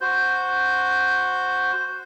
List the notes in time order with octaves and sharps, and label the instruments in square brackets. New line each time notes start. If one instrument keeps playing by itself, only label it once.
[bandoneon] F#4 C5 G6